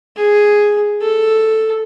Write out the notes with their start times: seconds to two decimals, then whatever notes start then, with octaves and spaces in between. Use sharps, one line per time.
0.17 G#4
1.02 A4